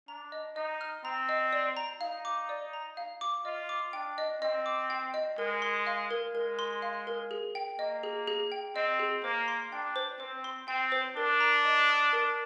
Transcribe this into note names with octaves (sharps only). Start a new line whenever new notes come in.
D4 A#5
D#5
D#4 D#5
F6
C4 A#5
D#5
D5
A#5
D#4 F5
D6
D5
A#5
F5
D6
F4 D#5
D6
D4 G5
D#5
C4 D#5
D6
G5
D#5
G#3 A#4
C6
F5
A#4
G#3 A#4
C6
F5
A#4
G#4
G5
A#3 D#5
G#4
G#4
G5
C4 D#5
G#4
A#3 C5
C6
D4 G5
C5
C4 C5
C6
C4 G5
C5
D4 A#4
A#5
D#5
D#6
A#4